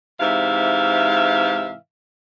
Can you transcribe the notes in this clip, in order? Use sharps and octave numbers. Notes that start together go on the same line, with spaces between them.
G#2 C3 E3 E5 F5